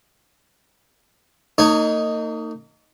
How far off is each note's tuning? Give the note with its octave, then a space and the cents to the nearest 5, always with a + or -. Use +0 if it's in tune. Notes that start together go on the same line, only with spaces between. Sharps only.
A#3 -40 D#4 +0 C#5 +0